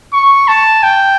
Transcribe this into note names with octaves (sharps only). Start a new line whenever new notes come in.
C#6
A5
G5